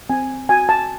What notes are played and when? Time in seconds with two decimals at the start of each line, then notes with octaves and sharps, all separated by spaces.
0.10 C4 G#5
0.49 F#4 G#5
0.69 A5